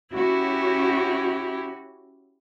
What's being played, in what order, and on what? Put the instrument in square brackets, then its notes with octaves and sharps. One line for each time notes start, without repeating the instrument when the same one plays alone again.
[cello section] C#4 F#4 [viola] E4 G4